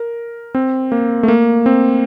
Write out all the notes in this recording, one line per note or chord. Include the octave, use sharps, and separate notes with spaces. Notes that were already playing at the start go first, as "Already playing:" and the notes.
Already playing: A#4
C4
A#3
A3
A#3
C4